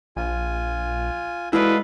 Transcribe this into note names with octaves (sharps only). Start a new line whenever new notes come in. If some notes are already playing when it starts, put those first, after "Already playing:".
A#1 F4 G#5
G#3 E4 F#4 G#4 A4 B4 D5 F5